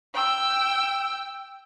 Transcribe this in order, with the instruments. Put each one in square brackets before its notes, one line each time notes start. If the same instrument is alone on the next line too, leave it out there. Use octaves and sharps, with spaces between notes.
[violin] G5 E6